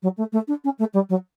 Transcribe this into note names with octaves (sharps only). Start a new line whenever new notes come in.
F#3
A3
A3
D4
C#4
A3
G3
F#3